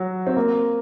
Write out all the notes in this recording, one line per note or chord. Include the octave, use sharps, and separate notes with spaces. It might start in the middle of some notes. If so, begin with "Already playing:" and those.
Already playing: F#3
C4
A#3